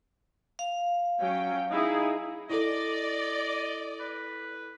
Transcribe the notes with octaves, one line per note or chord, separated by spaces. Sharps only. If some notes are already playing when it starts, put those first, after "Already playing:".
F5
F#3 C#4 G5
D#4 E4 G#4
E4 A4 D5 D#5
B4